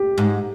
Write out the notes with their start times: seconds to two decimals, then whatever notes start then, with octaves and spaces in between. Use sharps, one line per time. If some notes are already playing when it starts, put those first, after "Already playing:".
Already playing: G4
0.18 G#2